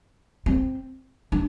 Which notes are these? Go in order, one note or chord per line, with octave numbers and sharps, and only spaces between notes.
C4
D4